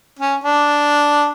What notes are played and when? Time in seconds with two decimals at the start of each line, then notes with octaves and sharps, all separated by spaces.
0.19 C#4
0.44 D4